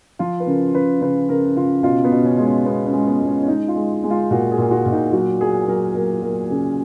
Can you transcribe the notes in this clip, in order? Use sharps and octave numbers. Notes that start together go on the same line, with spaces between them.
F3 F4
B4
C#3 A#4
C#3 B4
C#3 B4
C#3 A#4
C#3 F4
B2 F4
B3
B2
C#4
G#3
C#4
G#3 B3
C#4
G#3
B3
G#3
C#4
C#4
G#3 D#4
F4
G#3
G#3
F4
A#2 F#4
G#4
A#2
F#4
A#2
D#4
F#3 F#4
F#3 G#4
F#3 A#4
F#3 A#4
F#3 A#4
C#3 G#4